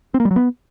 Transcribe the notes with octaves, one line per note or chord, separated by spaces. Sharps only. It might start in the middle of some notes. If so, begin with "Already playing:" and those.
C4
A#3
G3
F#3
B3